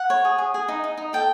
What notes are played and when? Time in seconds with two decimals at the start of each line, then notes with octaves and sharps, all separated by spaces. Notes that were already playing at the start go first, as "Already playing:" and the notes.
Already playing: F#5
0.10 C#5
0.25 G#4
0.38 G#4
0.54 G#4
0.68 D#4
0.84 D#4
0.97 D#4
1.13 A4 G5